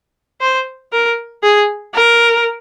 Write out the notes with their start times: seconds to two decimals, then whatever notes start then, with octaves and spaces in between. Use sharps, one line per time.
0.41 C5
0.92 A#4
1.43 G#4
1.94 A#4